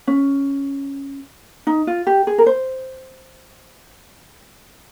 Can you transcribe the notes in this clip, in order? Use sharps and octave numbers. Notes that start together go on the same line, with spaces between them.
C#4
D#4
F4
G4
G#4
A#4
C5